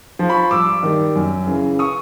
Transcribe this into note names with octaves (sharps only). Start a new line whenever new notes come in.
F3
B5 C#6
G2 D6 E6
D#3 G3
F#2
C#3 E3
C#6 D#6